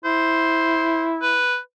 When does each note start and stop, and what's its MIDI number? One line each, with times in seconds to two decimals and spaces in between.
0.04 1.45 64
0.04 1.10 72
1.22 1.58 71